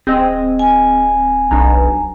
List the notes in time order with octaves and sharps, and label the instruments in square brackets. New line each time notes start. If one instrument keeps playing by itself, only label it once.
[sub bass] D1 [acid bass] C4 [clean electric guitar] G#4 D#5
[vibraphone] G#5
[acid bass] B1 [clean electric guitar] D4 A#5